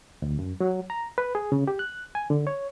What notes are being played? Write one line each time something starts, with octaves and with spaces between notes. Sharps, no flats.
D2
F#2
F#3
A#5
B4
G#4
C#3
G4
F#6
G#5
D3
C#5